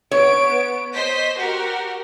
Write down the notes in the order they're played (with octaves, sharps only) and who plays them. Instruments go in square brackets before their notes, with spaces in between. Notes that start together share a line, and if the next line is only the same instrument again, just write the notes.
[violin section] B3 D7 [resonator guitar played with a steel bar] C#5
[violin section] C5 D#5 B6
F#4 G4 A#4